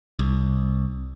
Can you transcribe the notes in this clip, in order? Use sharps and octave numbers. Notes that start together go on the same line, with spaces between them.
C2